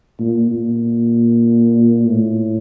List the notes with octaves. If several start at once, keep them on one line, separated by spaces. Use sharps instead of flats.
A#2
A#2
A2